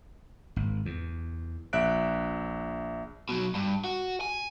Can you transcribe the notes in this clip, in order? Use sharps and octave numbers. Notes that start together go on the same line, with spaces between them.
G#1
E2
A#1 E5 F#6 D7
B2 F#3
G2
F#4
G#5